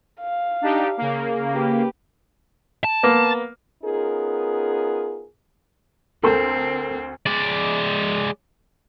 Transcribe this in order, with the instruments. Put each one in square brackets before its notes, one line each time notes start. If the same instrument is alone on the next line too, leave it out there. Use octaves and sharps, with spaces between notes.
[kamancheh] F5
[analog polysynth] D4 D#4 G4
C#3 A#3
[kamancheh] G4 B4
[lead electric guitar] A5
[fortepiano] A#3 B3
[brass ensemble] B3 C#4 D#4 F4 G#4 A#4
[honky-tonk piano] D2 C6 G6 [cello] C4 [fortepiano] A4 A#4
[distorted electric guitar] G#3 D5